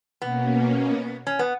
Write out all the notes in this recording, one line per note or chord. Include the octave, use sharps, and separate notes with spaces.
B2 A#3 B3 C#4
C#4
B3